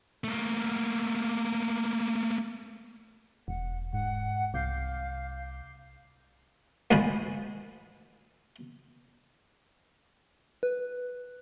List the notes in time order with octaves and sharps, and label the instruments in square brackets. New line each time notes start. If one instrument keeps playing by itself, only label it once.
[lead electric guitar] A3 A#3
[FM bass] E1 [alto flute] F#5
[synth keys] G#2 [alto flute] F#5
[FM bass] C2 [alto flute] F5 [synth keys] D6 G6 C7
[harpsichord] D2 G#2 F3 G#3 C5 B5
[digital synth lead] B4